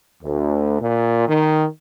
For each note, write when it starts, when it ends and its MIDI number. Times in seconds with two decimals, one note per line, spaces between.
0.24 0.80 38
0.80 1.27 46
1.28 1.66 51